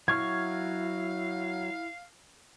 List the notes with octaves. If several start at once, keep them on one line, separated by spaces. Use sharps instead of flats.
F#3 E4 F5 C#6 F6 G#6